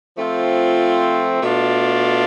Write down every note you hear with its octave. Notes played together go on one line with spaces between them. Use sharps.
F3 A3 C4 F4
B2 A3 D4 F4